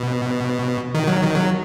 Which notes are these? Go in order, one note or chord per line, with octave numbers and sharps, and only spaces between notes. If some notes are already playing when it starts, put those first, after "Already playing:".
Already playing: B2
D#3
F#3
D#3
F#3